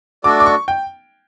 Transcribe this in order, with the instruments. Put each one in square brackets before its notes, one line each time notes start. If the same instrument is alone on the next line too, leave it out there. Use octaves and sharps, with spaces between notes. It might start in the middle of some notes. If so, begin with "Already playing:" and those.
[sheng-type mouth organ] A3 D4 F#4 A4 D5 [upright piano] D6
[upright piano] D6
C#6
G5